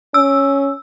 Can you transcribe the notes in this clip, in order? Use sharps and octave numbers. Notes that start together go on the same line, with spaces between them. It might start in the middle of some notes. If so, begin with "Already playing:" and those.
C#4 E6